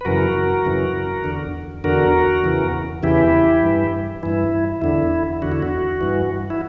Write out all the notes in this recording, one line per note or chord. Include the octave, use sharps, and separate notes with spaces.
B4
F#2 C#3 E3 F#4 A#4
F#2 C#3 E3
E2 D3
E2 D3 F#4 A#4
E2 C#3 E3
E2 C#3 E3 E4 G4
G2 E3
G2 E3 E4
E2 D3 E4
E2 D3 F#4
E4
F#4
G2 E3
E4